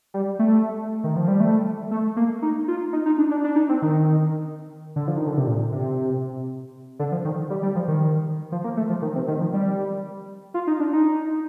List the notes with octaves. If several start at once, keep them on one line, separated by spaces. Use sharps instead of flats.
G3
A3
D#3
F3
G3
A3
A3
A#3
D#4
F4
D#4
D#4
D4
D4
D4
D#4
C4
D#3
D3
F3
D#3
D3
C3
A#2
C3
D3
F3
D#3
G3
G3
F3
D#3
F3
A#3
A3
F3
D#3
C3
D#3
F3
G3
F4
D#4
D4
D#4